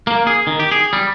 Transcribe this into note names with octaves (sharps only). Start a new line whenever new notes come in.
A#3
G#4
D#3
G4
G#4
G3